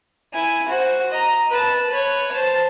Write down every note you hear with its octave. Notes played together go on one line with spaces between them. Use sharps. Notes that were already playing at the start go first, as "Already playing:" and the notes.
E4 G#5
F#4 C5
D#5 A#5
B4 A5
B4 C#5
C5 A5